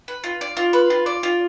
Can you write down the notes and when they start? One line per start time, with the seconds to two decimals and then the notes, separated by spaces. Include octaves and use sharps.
0.08 B4
0.24 F4
0.41 D5
0.57 F4
0.73 B4
0.90 F4
1.06 D5
1.23 F4